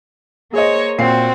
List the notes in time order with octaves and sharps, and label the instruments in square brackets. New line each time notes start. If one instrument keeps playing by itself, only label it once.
[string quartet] A#3 C5 C#5 [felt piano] G#4 D#5
[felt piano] A#2 C7 [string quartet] C4 F#4